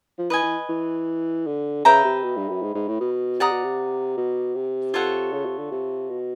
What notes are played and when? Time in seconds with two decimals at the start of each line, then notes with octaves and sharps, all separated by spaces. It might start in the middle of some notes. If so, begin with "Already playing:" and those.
0.19 F3
0.30 E3 B4 D#5 G#5
0.43 E3
0.69 E3
1.47 D3
1.85 C#3 B4 E5 G5 A#5
2.04 C3
2.23 B2
2.37 G2
2.49 F#2
2.63 G#2
2.75 G#2
2.88 A2
3.01 B2
3.40 C3 D5 F#5 A#5 D#6
3.51 B2
3.64 C3
4.17 B2
4.56 C3
4.94 F4 A4 C#5 F#5
5.33 C#3
5.45 C3
5.59 D3
5.72 C3
6.10 B2